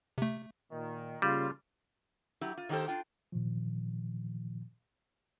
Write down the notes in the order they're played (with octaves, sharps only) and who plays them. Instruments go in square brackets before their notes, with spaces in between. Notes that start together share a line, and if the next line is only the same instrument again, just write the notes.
[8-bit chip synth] C3 A3
[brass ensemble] A#2 D#3
[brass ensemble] C#3 A#3 F4 [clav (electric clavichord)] G3
[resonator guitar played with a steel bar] F#3 E4 G4
F4
D#3 F#3 A#3 G4 A4 C5
D4 F4 G5
[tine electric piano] A#2 D#3 F3